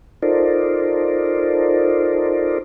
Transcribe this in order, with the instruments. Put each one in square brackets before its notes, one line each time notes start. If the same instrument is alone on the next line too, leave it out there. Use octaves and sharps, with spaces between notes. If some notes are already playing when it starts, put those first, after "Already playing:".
[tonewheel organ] D#4 F4 A4 A#4 C5 D5